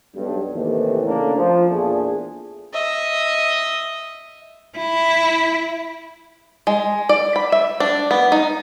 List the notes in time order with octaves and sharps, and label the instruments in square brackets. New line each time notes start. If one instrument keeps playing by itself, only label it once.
[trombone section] B1 G2
D#2 A2 C3 E3
C#3 A3 A#3 D4
F3
E2 A#2 A3 D4 G#4
[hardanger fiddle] D#5 E5
[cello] E4
[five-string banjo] G#3
D5
B5
E5
D4
B3
D#4